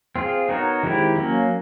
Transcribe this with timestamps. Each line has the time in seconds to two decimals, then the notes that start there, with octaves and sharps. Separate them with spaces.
0.16 C4 F4 G#4
0.49 B3 D#4 F#4 A#4 C#5
0.83 D#3 G#3 C4 E4 G4
1.16 F#3 A#3 C#4